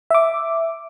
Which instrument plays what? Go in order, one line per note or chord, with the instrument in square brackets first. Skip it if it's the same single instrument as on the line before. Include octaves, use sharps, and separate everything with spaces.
[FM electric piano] E5 D6